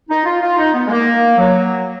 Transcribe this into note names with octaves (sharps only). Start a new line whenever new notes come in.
D#4
F4
F4
D#4
B3
G#3
A#3
F#3